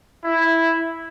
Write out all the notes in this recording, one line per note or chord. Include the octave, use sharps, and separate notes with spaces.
E4